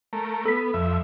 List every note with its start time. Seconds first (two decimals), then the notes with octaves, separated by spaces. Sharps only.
0.13 A3 A#4
0.46 B3 A4 B6
0.74 F2 E5